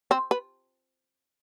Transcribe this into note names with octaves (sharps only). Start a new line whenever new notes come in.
C4
B4